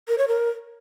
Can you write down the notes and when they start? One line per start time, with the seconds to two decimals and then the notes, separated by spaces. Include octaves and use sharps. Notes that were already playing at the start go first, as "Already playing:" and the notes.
0.08 A#4
0.18 C#5
0.28 A#4